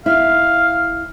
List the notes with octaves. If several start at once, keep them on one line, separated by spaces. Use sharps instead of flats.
E4 F5